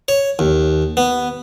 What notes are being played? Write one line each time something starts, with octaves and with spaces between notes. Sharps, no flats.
C#5
D#2
B3